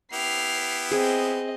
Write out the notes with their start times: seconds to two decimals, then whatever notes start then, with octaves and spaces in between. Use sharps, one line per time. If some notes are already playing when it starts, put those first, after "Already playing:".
0.13 B3 E4 G4 C7 F7
0.91 C4 G#4 D#5